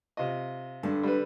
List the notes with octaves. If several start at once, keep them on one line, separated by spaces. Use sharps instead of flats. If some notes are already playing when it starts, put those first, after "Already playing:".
C3 F4 D#5
G2 D3
G3 B4